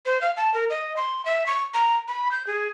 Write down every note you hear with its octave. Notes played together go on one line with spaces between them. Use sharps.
C5
F5
A5
A#4
D#5
C6
E5
C#6
A#5
B5
G6
G#4